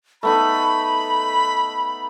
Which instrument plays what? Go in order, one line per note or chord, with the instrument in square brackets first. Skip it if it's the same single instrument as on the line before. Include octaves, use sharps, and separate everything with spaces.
[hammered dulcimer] A3 B3 D#4 [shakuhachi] B5